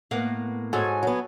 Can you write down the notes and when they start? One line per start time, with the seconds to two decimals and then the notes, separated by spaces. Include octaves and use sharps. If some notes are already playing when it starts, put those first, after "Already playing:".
0.11 A2 A#3 B3 F5 F#5
0.73 G#2 F#4 A4 C#5 G#5
1.03 F#3 B3